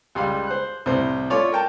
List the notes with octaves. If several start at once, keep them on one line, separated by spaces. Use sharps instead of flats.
C#2 G3 F5 B5
C5 F#6
C2 A2 C5
A3 F4 C#5 D5
A#4 G5 A5